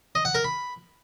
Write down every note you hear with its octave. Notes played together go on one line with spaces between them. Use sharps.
D#5
F#5
A#4
B5